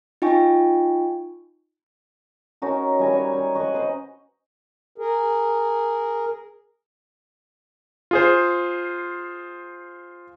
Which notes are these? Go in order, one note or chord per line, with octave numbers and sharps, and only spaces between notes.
D#4 F4 G5 G#5 C#6
C#4 D#4 F#4 A#4
G3 G#5 A#5
C#5
G#5
D#5 F#5 C#6
B4 C5 D#5 F#5
G#4 A#4
F4 G#4 C5